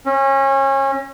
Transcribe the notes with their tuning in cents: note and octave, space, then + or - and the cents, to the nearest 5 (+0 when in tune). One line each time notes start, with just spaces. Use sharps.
C#4 -30